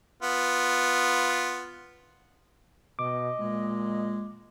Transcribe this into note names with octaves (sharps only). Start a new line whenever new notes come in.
B3 F4
B2 D#5 D6
A#2 G#3